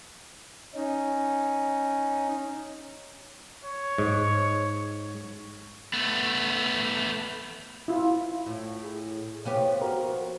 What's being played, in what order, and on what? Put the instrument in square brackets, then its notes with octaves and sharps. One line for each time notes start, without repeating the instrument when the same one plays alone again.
[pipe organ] C#4 D#4
[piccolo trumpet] C#5
[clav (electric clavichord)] G#2
[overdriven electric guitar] A3 B3
[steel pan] E4 F4
[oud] A2
[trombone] G#4
[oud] F3 B3 G4 [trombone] C#5
[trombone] F#4 [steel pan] A#4